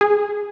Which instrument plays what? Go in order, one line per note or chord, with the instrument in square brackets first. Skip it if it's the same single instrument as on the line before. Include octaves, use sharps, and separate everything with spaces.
[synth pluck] G#4